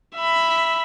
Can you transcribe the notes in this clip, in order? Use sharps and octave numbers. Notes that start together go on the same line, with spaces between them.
E5 B5